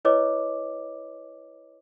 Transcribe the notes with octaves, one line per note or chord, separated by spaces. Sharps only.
E4 B4 C#5 D#5 D6